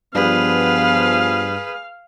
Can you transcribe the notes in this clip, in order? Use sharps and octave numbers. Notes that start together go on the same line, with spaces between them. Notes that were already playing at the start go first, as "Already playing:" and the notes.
G2 F3 G3 B3 G#4 B4 F5